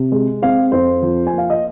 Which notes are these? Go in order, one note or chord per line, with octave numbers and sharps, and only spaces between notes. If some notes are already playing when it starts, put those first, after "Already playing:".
Already playing: C3
G#3
C4 F5
F2 C5
F3
G#5
A#3
F5
D#5